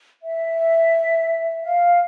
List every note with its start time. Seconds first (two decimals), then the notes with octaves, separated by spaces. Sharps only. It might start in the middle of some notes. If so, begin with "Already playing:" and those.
0.22 E5
1.62 F5